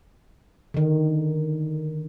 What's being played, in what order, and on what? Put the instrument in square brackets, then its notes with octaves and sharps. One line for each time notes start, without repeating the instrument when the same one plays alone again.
[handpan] D3 D#3